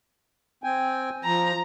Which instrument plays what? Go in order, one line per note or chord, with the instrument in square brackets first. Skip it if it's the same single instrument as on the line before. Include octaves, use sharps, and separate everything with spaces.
[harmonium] C4 G5 G#5
[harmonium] F3 [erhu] A#5